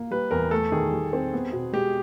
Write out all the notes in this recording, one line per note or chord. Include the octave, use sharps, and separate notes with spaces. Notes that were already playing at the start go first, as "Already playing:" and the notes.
Already playing: A#3
G3 B4
E2 A#4
A3 A4
D#3 G#4
G3
C4
B3
B2
G#3 G4